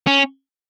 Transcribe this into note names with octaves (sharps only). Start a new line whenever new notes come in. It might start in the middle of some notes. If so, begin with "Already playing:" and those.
C#4